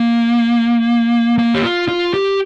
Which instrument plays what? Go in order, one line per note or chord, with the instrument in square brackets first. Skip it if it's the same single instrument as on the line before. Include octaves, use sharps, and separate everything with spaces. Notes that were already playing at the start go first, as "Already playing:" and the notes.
Already playing: [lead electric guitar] A#3
A#3
G4
F4
F4
G4